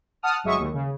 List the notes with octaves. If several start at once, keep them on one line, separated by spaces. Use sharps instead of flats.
F#5 A5 D#6 F6
G1 F#3 G#3 E5 C#6 D#6
D#2
C#3